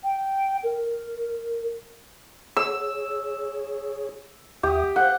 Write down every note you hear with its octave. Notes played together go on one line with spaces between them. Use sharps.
G5
A#4
G#4 C#5 E6
D#2 G4 E5 D#6
C5 F5 F#5 G6